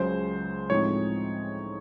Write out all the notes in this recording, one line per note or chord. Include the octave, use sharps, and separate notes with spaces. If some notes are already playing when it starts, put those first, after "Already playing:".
Already playing: C#2 C#3 F#3 C5
A2 F3 G#3 C4 D#4 C#5